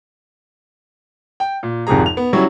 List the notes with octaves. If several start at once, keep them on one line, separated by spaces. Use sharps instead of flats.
G5
A#2
G#1 F2 C3 G#3 G#4 A#5
F7
B3
F#3 G3 C#4 E4 F#4